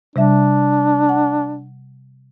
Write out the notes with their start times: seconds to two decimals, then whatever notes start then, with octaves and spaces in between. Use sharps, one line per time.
0.16 C3 G3 D4 E5
1.09 F#5